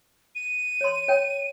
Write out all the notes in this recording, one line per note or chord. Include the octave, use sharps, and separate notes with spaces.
D#7
C#5 C6
C#5 G5